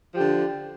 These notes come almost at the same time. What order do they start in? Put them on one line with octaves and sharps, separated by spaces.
F3 G4 D3